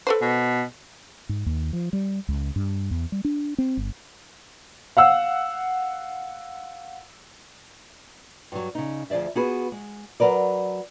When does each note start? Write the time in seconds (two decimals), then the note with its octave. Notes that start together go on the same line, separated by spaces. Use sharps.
0.07 A4 B4 C5
0.21 B2
1.29 G#2
1.46 D#2
1.73 F3
1.93 G3
2.28 C#2
2.56 G2
2.91 E2
3.12 G3
3.25 D4
3.58 C4
3.77 G1
4.97 F5 F#5 E6
8.52 G2 F#3
8.75 C#3 D#4
9.10 D2 F3 G#4 D5 E5
9.35 B3 F4 F#4 G#4 B4
9.72 G#3
10.20 F#3 A#4 B4 D5